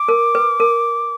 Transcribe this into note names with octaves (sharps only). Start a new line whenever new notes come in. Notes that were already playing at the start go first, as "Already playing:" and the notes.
Already playing: D6
A#4
B4
A#4